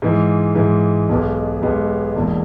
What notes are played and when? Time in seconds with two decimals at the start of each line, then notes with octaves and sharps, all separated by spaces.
0.02 G#2 E3 G#3
0.55 G#2 E3 G#3
1.09 B1 B2 G#3 B3 G4
1.61 B1 B2 G#3 B3 G4
2.15 E1 E2 B2 A#3